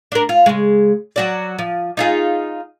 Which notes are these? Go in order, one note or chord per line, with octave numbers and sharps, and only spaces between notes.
D4 A#4
F4
C#3 G#3
F#3 F#4 D5
F3
D#4 F4 G#4